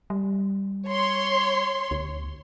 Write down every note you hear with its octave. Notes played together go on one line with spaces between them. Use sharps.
G3
C#5 C6
D2